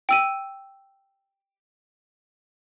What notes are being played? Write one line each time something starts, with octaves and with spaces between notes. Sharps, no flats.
G5 E6 D#7